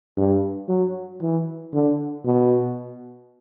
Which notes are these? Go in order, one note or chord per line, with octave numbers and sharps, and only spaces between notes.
G2
F#3
E3
D3
B2